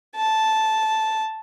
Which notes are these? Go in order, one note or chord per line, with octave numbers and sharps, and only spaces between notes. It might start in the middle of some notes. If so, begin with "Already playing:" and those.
A5